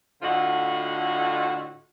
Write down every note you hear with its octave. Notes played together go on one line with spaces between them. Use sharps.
A2 D3 F4 F#4 D#5 F#5